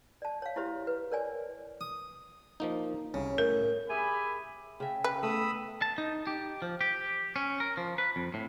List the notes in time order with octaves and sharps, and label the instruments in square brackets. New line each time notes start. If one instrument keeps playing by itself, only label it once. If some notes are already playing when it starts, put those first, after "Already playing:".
[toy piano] D5 A5
C#5 F5
E4 F#4 G4 C5 C#5 E5
B4
A#4 C#5 D5 G#5
[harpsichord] D#6
[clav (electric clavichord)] F3 A#3 D#4
[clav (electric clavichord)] C2 [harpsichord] C#3
[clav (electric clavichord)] A2 [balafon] A#4
[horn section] G4 G#4 E5 G#5 B5
[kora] C#3 E5 [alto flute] G5
[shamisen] B4
[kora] A3 B3 [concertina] B5 D#6 E6
[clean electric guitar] A5
D#4
G4
F3
G4
C#4
A#4
F3
B4
F2
A2